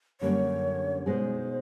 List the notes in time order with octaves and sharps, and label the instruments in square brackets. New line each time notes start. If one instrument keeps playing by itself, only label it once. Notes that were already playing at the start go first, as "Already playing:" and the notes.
[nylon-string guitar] F#2 D3 G3 A#3 C#4 [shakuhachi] C#5
[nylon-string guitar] B2 G#3 B3 D#4 G#4 [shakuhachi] C5